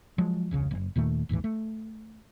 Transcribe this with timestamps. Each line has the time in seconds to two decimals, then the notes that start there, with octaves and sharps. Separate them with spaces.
0.18 F3 F#3 G#3
0.51 E1 C#2 C#3
0.71 F#1
0.96 D#2 A#2 D#3 A3
1.29 A1 D#2 G#2 E3
1.44 A3